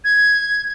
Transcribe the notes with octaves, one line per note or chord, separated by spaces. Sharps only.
G#6